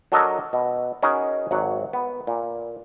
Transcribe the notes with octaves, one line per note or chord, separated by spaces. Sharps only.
F#3 D4 A4 A#4 D#5
B2
C#4 D#4 F#4 G#4 A#4
G#1 F#3 F#5
B3
A#2